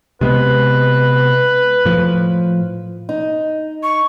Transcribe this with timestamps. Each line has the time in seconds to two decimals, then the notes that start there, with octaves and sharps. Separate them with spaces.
0.21 C3 G#3 B3 B4
1.85 A2 F3
3.09 D#4
3.83 C#6